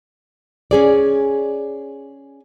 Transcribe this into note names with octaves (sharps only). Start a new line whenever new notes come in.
C#4 G#4 D5